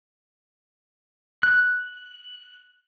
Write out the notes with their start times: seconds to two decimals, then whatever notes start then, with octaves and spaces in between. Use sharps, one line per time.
1.43 F#6